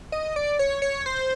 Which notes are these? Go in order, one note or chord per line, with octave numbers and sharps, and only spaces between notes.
D#5
D5
C#5
C#5
C5